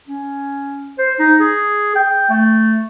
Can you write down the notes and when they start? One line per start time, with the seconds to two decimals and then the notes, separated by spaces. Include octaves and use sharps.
0.07 C#4
0.98 C5
1.19 D#4
1.40 G#4
1.95 G5
2.30 A3